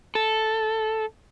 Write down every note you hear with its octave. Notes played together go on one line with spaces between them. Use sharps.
A4